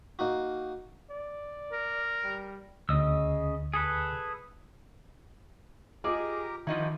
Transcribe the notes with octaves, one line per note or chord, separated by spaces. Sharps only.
A#3 D#4 F#4
D5
A#4
G3
D2 C#3 D#5 E6
G#4 A4 B4
F4 G4 G#4 A#4 D#5 A#5 D6
D#3 F3 D#4 E4 F#4